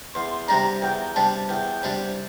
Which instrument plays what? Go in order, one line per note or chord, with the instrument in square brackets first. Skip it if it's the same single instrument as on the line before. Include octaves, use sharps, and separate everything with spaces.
[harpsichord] E2 [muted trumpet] C6
[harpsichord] C3 G3 D4 [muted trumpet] A#5
[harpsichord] E2 [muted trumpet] G5
[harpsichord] C3 G3 D4 [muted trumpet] A5
[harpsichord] E2 [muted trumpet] G5
[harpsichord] C3 G3 D4